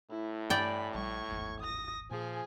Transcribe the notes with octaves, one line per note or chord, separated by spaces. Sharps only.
A2 E4
G2 D5 G5 G#5 B5
A#1 G3 C#6 G#6
D1 G#1 E2
D#6 A#6
A#2 F3 G#4 G#5